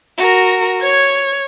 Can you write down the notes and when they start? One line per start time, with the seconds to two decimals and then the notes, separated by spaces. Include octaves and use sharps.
0.17 F#4 A#4
0.82 C#5 G#6